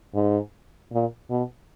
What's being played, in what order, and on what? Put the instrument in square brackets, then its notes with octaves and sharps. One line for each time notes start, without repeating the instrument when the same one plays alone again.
[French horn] G#2
A#2
B2